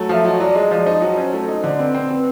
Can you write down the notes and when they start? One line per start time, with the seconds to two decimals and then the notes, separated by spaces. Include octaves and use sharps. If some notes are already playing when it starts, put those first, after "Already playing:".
Already playing: F#3 A3
0.09 F3 E5
0.25 F#3 D#5
0.34 C#5
0.40 F#3 D5
0.55 G#3 D#5
0.71 F3 D5
0.86 D#4 C5
1.01 F#3
1.17 C#4
1.33 A3
1.48 D#4
1.64 D3
1.79 C4 B4
1.95 C4
2.10 C4